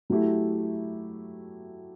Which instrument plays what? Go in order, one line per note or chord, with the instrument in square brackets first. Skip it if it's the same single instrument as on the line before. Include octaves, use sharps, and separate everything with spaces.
[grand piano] F#3 A3 E4 G4